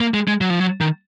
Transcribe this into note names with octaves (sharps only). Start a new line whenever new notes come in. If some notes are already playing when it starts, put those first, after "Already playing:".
A#3
G#3
G#3
F#3
F3
F#3
D#3